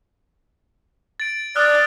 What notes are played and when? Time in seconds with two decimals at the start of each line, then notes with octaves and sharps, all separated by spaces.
1.20 A6 D7
1.56 D5 D#6 F6 F#6